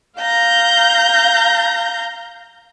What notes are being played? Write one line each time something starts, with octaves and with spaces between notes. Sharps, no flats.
F5 A#5 G6